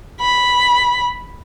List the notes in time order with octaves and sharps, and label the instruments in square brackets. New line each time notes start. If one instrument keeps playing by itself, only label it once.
[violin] B5